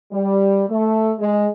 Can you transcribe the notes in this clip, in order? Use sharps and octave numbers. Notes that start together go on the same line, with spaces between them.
G3
A3
G#3